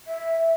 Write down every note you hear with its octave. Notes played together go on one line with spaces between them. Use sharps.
E5